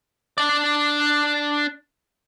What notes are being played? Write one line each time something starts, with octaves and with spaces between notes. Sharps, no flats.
D4 D5